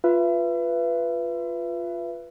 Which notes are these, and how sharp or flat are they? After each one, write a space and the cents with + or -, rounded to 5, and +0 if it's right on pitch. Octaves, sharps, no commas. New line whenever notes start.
F4 +0 B4 +0 E5 +35